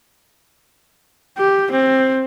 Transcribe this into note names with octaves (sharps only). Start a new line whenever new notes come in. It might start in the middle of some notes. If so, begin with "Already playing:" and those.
G4
C4